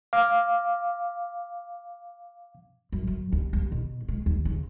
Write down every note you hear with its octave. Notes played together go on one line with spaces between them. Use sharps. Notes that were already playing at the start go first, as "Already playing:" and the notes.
F5 D6
F#2
F#2
D#2
D#2
B2
G#3
D#2
C#3